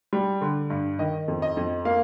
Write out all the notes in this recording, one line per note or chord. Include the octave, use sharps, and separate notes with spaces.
G3
D3
G2
D#3 D#5
F2
D#5
F2
A#3 F5